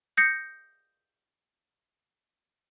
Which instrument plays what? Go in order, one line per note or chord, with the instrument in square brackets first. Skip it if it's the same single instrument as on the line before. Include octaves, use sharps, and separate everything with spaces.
[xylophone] D#6 G6 A#6 C7 C#7